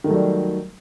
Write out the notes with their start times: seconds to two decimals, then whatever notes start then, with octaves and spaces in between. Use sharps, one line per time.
0.04 D#3
0.07 A3
0.10 F#3
0.13 G3